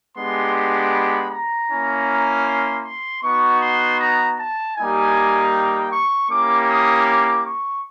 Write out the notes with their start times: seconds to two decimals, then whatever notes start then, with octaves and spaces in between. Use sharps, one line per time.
0.16 G#3 B3 D4 G4 C6
0.55 C6
0.93 B5
1.31 A#5
1.70 A#3 C#4 E4
2.47 C6
2.85 C6
3.23 B3 D#4 F#4 C#6
3.61 C6
4.00 A#5
4.38 A5
4.77 G3 A#3 D#4 G4 G#5
5.54 G5
5.92 C#6
6.30 A#3 C#4 E4 G4 D6
6.69 D#6
7.07 D6
7.46 C#6